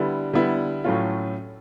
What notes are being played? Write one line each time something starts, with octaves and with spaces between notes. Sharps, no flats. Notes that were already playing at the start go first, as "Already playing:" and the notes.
Already playing: D3 G3 B3 E4
D3 G3 B3 E4
A2 F#3 A3 C#4 F4